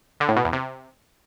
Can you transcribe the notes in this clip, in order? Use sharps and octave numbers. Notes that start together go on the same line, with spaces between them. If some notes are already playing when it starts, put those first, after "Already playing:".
D3
A2
B2
E2
C3